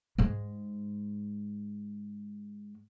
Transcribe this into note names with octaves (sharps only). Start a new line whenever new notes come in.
G#2 G#3